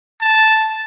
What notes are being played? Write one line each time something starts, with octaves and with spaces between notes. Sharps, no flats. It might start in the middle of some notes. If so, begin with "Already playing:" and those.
A5